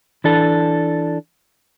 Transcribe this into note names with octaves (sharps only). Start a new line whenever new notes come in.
E3 D4 A4